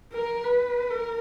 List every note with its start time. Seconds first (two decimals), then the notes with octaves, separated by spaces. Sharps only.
0.13 A#4
0.44 B4
0.90 A#4